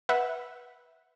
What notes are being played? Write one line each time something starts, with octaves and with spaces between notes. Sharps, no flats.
B4 E5 F#5